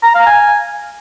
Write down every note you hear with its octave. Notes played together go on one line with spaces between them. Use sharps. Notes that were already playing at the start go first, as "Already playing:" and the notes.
A#5
F5
G#5